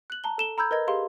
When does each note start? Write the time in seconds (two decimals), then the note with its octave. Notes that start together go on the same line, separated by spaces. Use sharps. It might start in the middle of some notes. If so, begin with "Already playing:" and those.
0.10 F#6 F#7
0.24 A5 A#5 G7
0.38 A4 E7 G7
0.58 A#5 B5 E6 G6 G#6
0.71 A#4 B4 D#5 G#6
0.87 G4 G#4 F5 C6